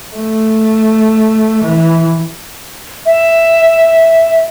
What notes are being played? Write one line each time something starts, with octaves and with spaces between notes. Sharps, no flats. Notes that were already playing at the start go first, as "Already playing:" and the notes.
A3
E3
E5